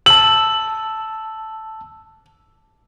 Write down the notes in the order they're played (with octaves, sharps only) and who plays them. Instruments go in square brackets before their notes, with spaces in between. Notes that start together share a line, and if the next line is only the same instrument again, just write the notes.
[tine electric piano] A5 E6 [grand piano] F#7